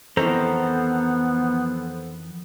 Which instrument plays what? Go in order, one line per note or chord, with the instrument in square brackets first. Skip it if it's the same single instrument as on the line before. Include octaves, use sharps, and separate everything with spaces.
[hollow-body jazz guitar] F2 D#3 E3 [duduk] B3 [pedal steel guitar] A4 C5 A#5